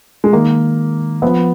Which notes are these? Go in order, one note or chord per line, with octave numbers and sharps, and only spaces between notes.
G#3
D#3 A#3
F3 B3